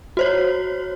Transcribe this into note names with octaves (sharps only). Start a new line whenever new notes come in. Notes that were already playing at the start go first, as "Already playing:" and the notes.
F#4 C5 C#5